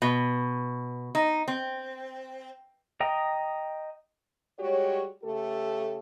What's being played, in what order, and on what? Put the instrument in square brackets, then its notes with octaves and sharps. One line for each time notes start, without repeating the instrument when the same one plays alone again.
[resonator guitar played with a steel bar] B2
D#4
C4
[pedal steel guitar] D#5 G5 A#5 D#6
[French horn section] G3 G#3 F#4 G4 C#5
C#3 A3 G4 A4